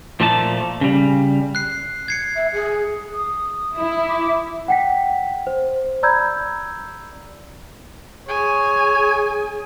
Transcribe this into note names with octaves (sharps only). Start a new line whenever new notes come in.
A#2 F3 A3 A#3 D5 A5
C#3 G3
F#6 C7
G#6 C7 C#7
E5
G#4
D#6
E4
D6
F#5 G5 B6
C5
D5 A#5 B5 E6 G6 G#6
G#4 C#5 G#5